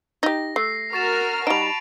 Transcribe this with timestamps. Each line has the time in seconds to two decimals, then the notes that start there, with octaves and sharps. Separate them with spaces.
0.23 D#4 G4 A#6
0.56 A3 C7
0.93 F#4 A#4 C#6 F6 A6 E7
1.47 G3 D#4 A5 B5 D7 F7